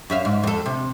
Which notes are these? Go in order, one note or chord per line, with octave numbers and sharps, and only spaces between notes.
F#2 E5 F5
G#2
F2 A4
C3